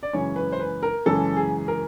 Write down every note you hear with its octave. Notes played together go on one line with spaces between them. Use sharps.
D5
F#2 C#3 E3 G#3 C#4 C#5
B4
C5
B4
A#4
F#2 C#3 E3 G#3 C#4 A4
G#4
A#4